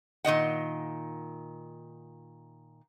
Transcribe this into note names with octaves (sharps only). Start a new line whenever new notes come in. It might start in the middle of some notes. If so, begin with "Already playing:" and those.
A#2 D#3 D#5 F#5